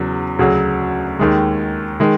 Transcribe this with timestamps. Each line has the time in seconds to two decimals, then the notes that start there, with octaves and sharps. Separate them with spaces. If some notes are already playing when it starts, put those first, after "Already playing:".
Already playing: E2 C#3 F#3
0.39 D2 C#3 F#3
1.19 D#2 D#3 G#3
2.00 D#3 G#3